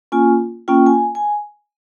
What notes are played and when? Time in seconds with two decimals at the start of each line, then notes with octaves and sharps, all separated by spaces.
0.12 A#3 C#4 F4 G#5
0.68 A#3 C#4 F4 G5
0.86 G#5
1.15 G#5